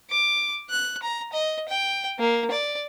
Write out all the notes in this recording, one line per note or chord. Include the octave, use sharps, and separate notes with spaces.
D6
F#6
A#5
D#5
G5
A#3
D5